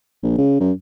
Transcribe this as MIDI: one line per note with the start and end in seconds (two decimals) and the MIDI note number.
0.23 0.37 34
0.38 0.59 49
0.60 0.72 42